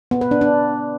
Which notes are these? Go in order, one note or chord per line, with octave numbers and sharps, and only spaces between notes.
B3
B4
D4
D4